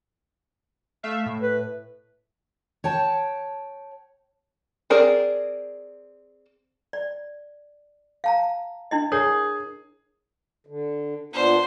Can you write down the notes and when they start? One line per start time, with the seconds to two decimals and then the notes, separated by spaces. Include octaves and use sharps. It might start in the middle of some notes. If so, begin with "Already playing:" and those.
1.03 A3 E5 F5
1.26 A2
1.42 B4
2.84 C#5 G5 A5
4.90 C4 G#4 A#4 D5
6.93 D5
8.24 F5 A5 A#5
8.91 D4 E4 D#5
9.12 G#4 A#4 C#5
10.67 D3
11.33 A#2 B3 D4 C5